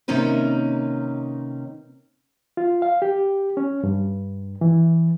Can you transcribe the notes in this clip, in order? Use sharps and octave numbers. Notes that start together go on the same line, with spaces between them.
C3 D#3 A#3 C#4 D#4 B4
F4
F5
G4
C#4
G2
E3